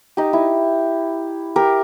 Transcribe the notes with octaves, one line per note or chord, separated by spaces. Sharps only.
D#4 G4
E4
G4 A#4